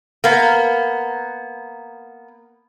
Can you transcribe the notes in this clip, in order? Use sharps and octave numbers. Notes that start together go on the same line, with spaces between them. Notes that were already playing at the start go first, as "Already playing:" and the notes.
A#3 B3